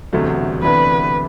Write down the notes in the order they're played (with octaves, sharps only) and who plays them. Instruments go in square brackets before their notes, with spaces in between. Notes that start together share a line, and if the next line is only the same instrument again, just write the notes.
[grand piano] E1 D2 C3 F#3 A3
[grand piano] D2 C3 E3 B3 D4 [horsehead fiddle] B4